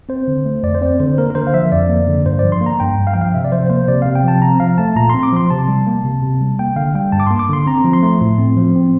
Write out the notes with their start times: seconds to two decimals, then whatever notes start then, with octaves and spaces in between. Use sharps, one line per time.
0.09 C4 C5
0.28 D3
0.45 A3
0.63 F2 D5
0.75 C5
0.82 C4 D5
1.00 D3 C5
1.18 A#3 A#4
1.30 A#4
1.35 D3 C5
1.47 F5
1.54 F3 E5
1.72 F2 D5
1.89 A#3
2.07 D3
2.26 G2 C5
2.39 D5
2.44 F3
2.52 C6
2.61 A#3
2.66 A#5
2.80 G2 G5
2.98 G2
3.07 F5
3.14 F3 G5
3.21 F5
3.34 C3 E5
3.45 D5
3.52 F3 C5
3.70 A#3 C5
3.88 C3 D5
4.02 C3 F5
4.15 G5
4.24 F3 A5
4.42 C4 A#5
4.60 F3 F5
4.78 A3 A5
4.96 A#2 A#5
5.10 C4 C6
5.23 D6
5.33 F3 C6
5.50 C3 A5
5.68 G3
5.87 A#3
6.04 C3
6.22 C3
6.41 G3
6.59 A#3 G5
6.76 D3 F5
6.95 G3 G5
7.12 G2 A5
7.20 D6
7.27 A#3 C6
7.39 D6
7.49 D3 C6
7.66 C4 A#5
7.85 F3
7.93 C6
8.03 A3
8.21 A2
8.38 C4
8.57 F3
8.75 C4